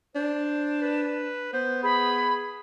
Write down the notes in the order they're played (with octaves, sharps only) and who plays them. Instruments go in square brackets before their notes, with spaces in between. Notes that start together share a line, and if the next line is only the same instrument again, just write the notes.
[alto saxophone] D4 [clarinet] C5
[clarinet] B4
[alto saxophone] B3 [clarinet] C5
[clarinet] G#4 [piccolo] B5